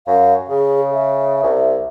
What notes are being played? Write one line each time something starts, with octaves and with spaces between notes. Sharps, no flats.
F#2 F5
C#3 G#4
E5
C2